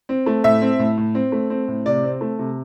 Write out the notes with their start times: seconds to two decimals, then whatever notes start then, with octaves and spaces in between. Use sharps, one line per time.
0.09 C4
0.26 A3
0.44 A2 E5
0.62 C4
0.79 A2
0.98 A2
1.15 C4
1.32 A3
1.50 C4
1.68 A2
1.86 C3 D5
2.03 C4
2.21 A3
2.39 C3